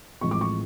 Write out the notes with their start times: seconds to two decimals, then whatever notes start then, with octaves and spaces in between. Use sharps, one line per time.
0.21 A1 A2 F3 G#3 C4 C#6
0.31 D6
0.41 C#6